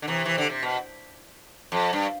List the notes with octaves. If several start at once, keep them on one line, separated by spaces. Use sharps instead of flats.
D3
C3 E3
E3
D3
C3
B2
F2
G2